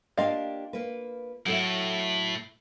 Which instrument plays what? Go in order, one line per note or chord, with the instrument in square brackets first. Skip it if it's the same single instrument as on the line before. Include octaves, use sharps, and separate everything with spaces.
[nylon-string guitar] A#3 D4 G4 [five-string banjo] F4 D#5 F5
[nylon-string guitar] A#3 B4
[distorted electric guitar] A2 [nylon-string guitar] F#3 A4 E5